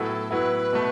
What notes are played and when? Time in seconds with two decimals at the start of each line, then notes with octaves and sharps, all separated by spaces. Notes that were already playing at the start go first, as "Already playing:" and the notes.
Already playing: A2 F#3 B3 E4 A4
0.31 A2 F#3 B3 E4 B4
0.73 B2 A3